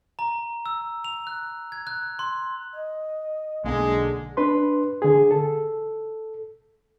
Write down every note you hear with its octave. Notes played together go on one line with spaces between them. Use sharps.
A#5
E6
F7
F#6
G#6
F#6
C6
D#5
B1 D3 G#3 A#3 G#4
D4 B4 C6
D3 G#4
A4